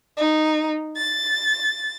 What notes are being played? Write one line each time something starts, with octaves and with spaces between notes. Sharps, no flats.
D#4
A6